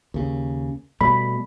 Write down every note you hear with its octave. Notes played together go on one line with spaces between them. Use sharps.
D#2 C#3
B2 G3 A3 B5